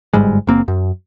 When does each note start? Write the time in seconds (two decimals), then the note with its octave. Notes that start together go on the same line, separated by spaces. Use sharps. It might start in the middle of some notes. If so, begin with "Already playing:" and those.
0.13 G1 G#2 G3 G#3
0.47 F#1 A#3 C4
0.68 F#2